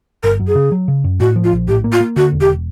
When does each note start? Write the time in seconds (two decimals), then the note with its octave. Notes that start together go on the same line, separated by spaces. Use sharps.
0.23 G1 A#4
0.40 F#2
0.48 G#4
0.55 C#3
0.72 F#3
0.88 C#3
1.04 F#2
1.20 A2 F#4
1.36 F3
1.44 F4
1.52 A#1
1.68 A2 G4
1.84 A#3
1.93 F4
2.00 A#3
2.16 D3 F#4
2.33 E1
2.41 G4